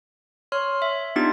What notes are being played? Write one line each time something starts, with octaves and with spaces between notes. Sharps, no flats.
C#5 C6 F6
E5
B3 D4 D#4 F4 G4 A6